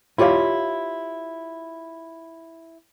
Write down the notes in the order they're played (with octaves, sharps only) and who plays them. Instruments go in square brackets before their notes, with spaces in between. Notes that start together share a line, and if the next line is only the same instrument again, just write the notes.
[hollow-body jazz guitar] E4 F4 G4 C#5 F5